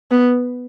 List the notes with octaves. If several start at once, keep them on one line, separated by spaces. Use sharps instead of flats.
B3